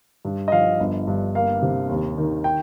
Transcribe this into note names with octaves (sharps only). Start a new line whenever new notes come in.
G2
D#5
F3 F5
G1
G2
A#3 F5
C3
D#2
D#3
G5